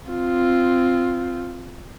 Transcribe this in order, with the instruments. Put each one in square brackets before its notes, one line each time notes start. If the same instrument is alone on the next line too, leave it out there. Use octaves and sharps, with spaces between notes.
[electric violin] C4 F4